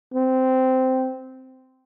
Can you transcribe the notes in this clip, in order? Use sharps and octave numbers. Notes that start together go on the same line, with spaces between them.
C4